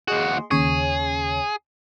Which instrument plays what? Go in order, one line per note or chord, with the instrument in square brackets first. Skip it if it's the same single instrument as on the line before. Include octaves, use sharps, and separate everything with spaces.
[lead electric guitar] D#2 F#4 [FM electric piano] G#4 D#5 C6
[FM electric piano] D#2 C#3 C#5 [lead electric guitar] G#4